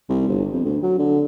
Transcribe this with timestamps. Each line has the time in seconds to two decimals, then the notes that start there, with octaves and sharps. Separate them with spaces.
0.09 C2
0.28 G1
0.53 F2
0.65 D2
0.83 F#3
0.99 D3